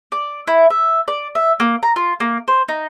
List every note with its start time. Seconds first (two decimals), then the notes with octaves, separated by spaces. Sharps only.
0.12 D5
0.47 E4
0.70 E5
1.08 D5
1.35 E5
1.60 A#3
1.83 A#5
1.96 F4
2.20 A#3
2.48 C5
2.68 D#4